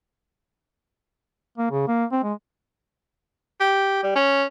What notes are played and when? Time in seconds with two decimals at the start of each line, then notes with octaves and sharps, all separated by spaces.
1.58 A#3
1.71 C#3
1.88 A#3
2.12 C4
2.23 G#3
3.60 G4
4.03 G3
4.15 C#4